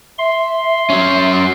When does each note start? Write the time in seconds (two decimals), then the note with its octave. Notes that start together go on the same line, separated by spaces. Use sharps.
0.19 E5 C6
0.90 F#3 C#4